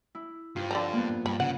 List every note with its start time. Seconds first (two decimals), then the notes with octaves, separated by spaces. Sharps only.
0.15 E4
0.56 G2 F4 C5
0.71 F2 D3 F3 A#5
0.93 A#3 B3
1.26 G2 B5
1.40 C#3 F#5